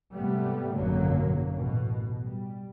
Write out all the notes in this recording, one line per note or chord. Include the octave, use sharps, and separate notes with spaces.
G#2 C3 G3 A3 B3
G#1 F#2 B2 D3 F#3 A#3
A1 B2
G3